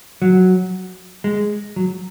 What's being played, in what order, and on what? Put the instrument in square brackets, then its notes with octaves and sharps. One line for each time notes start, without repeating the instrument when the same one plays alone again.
[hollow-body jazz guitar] F#3
G#3
F#3